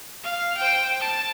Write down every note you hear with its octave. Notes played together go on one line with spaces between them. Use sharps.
F5
C5 G5
A5